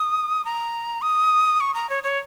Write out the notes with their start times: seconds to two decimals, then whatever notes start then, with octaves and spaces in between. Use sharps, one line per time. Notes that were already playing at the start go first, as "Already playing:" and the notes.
Already playing: D#6
0.45 A#5
1.02 D#6
1.60 C#6
1.74 A#5
1.90 C#5
2.04 C#5